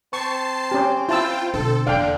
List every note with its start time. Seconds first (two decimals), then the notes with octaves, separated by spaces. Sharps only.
0.13 C4 A5 C#6 C7
0.71 C#4 G4
1.09 E4 F4 G5 A5 E6
1.54 B2 D3 C4 A4
1.87 E2 D3 A#3 D4 F5 G5